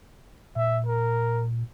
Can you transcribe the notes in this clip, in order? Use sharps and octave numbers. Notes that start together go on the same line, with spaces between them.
A#2 E5
A#4